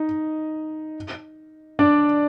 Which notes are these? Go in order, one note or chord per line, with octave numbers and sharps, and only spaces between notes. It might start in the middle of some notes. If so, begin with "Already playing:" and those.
Already playing: D#4 D#5
D4 D5